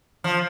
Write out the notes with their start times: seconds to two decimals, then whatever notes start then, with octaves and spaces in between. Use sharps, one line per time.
0.24 F3